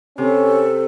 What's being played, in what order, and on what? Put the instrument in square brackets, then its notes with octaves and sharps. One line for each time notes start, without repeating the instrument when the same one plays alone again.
[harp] C3 [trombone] C#4 [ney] A4